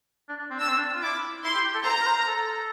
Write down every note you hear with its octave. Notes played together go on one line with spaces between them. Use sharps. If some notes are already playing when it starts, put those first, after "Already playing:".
D4
D4
C4
D4 E6
C4
D4
F4
E4 D6
E4 C6
G4
G4
A4
C5 A#5
A#4
C5
A4